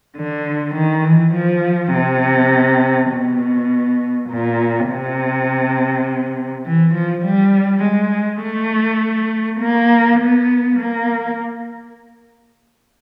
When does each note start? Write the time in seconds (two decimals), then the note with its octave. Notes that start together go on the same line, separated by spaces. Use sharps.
0.16 D3
0.75 D#3
1.04 E3
1.34 F3
1.94 C3
3.11 B2
4.29 A#2
4.89 C3
6.66 E3
6.94 F3
7.25 G3
7.84 G#3
8.42 A3
9.60 A#3
10.20 B3
10.79 A#3